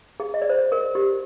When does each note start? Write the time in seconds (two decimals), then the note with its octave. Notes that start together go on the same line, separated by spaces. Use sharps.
0.20 G#4
0.34 D#5
0.42 D5
0.50 C5
0.72 A#4
0.95 G4